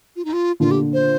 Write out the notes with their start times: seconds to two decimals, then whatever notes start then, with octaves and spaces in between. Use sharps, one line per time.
0.16 F4
0.25 D#4
0.33 F4
0.60 A#2 D3 F4
0.71 G4
0.93 C5